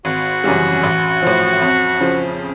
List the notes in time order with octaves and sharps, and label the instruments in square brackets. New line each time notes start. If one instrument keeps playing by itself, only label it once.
[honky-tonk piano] G#1 [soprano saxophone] F#4
[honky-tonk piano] F#2 C#3 E3 G3
A1
A2 F3
F2
C#3 F3